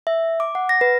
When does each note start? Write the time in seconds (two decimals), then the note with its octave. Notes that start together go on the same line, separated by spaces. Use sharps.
0.07 E5
0.40 D6
0.55 F#5
0.69 A#6
0.81 B4